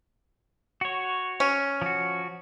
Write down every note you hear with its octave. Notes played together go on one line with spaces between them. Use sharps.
F#4 C#5
C#4
F3 F#4